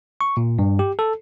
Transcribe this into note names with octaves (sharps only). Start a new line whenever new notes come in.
C#6
A#2
G2
G4
A4